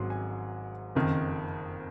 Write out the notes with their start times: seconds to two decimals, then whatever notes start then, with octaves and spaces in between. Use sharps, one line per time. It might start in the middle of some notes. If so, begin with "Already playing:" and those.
Already playing: G#1 G#2 F#3 C6
0.10 G#5
0.95 F#1 F2 D#3